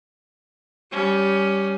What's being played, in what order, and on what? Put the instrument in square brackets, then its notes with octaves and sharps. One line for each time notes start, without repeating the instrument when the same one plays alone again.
[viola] G3 C#4